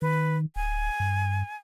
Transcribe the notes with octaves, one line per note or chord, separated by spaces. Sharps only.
D#3 B4
D1 G#5
G2